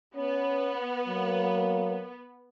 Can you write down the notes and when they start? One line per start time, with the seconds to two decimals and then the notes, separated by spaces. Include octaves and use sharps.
0.16 B3 C#4
1.08 F#3 A#3